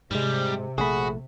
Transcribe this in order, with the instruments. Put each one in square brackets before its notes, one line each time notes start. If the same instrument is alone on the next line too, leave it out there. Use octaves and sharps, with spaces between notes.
[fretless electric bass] G#2 G#3 [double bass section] C3 [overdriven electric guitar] G3
[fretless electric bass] A#1 D3 A3 [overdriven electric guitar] F#4 [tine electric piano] G#4 B5